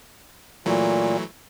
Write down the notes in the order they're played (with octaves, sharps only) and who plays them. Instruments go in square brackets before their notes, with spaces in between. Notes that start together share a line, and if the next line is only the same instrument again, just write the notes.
[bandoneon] A#2 [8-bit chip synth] E3 F#3 A3